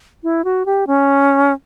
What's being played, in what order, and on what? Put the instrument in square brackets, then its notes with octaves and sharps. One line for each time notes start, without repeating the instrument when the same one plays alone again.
[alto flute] E4
F#4
G4
C#4